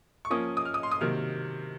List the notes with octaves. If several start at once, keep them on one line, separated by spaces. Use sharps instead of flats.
C#6
F3 A#3 C#4 D#6
D#6
F6
D#6
C6
D#6
C3 D#3 F#3 A#3 F6